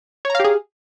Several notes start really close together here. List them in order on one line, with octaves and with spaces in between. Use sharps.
C#5 A#5 F5 G4 G#4